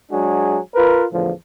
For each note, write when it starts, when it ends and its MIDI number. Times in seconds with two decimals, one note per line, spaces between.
0.11 0.58 54
0.11 0.58 56
0.11 0.58 62
0.11 0.58 66
0.11 0.58 68
0.75 1.06 65
0.75 1.06 70
0.75 1.06 71
1.13 1.31 40
1.13 1.31 45
1.13 1.31 50
1.13 1.31 53